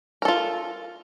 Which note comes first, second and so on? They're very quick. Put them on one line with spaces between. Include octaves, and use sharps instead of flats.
A#4 A4 F4